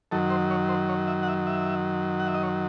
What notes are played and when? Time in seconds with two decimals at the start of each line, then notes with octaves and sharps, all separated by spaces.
0.12 F#2 D#3 F#3 A4
0.30 C5
0.50 C#5
0.69 C5
0.89 C#5
1.07 E5
1.23 F#5
1.28 E5
1.47 E5
2.20 F#5
2.28 E5
2.34 D#5
2.43 C#5